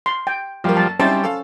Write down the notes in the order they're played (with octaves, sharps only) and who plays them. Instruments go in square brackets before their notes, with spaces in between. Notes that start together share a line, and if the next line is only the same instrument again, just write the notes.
[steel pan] C6
G5
[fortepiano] F#2 A#3 [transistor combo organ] F3 G3
[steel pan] A5
[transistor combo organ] G3 [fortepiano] C4 D#4 E4 [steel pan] C#4 C5 A5
[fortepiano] A4 F5